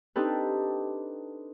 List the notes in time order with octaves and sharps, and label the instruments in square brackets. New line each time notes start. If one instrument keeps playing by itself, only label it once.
[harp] C4 D4 D#4 G4 A4 B4